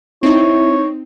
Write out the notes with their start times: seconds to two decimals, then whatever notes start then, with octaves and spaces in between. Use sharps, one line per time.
0.23 C4 D#4 E4 C#5